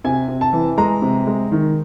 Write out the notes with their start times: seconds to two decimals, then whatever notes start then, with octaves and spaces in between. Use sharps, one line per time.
0.04 C3 G#5
0.28 C3
0.41 A5
0.53 E3
0.78 G#3 A#5
1.02 C3
1.27 G#3
1.52 D#3